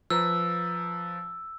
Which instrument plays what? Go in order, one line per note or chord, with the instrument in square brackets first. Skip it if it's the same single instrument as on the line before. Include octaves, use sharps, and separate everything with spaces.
[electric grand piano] F3 B4 A#5 [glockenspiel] E6